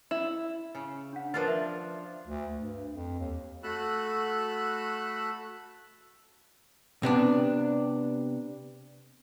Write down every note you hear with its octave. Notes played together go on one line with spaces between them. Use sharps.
E4
C#3
D4 F#5
F3 D4 F4 A#4 B4 A6
E5
D2
G2
F2
D#2
A3 F#4 A4 B5 E6 F#6
C3 B3 D4